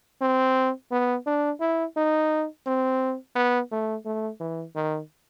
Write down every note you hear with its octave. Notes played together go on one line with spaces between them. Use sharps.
C4
B3
D4
E4
D#4
C4
B3
A3
A3
E3
D#3